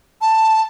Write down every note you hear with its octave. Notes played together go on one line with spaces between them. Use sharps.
A5